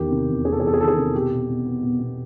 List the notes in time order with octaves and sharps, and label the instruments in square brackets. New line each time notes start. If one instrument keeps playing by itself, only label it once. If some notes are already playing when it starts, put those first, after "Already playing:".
Already playing: [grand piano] E2 D#3 G4
C3
E2
C3 G#4
A4
G#4
E2 A4
G#4
D#3 A4
G#4
C3
B2 G4
B2
B2
B3
B2
B2